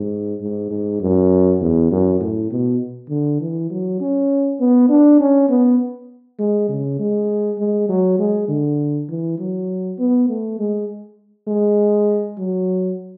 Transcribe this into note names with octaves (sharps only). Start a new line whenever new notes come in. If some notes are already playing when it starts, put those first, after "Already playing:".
Already playing: G#2
G#2
G#2
F#2
E2
F#2
A2
B2
D3
E3
F#3
C#4
B3
D4
C#4
B3
G#3
C#3
G#3
G#3
F#3
G#3
D3
E3
F#3
B3
A3
G#3
G#3
F#3